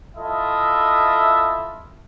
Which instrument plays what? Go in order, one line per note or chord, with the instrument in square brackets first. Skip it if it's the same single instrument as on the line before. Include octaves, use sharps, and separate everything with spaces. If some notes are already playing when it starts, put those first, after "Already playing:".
[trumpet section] E4 F4 A4 D#5 E5